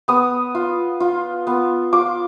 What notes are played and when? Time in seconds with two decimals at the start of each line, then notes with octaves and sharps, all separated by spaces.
0.08 B3 D#6
0.55 F4
1.00 F4
1.47 B3
1.93 F4 D6